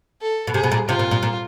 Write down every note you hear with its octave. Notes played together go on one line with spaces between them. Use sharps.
A4
B2
C3 G#4
B2
A#2
C3 F4
A#2
A#2
A#2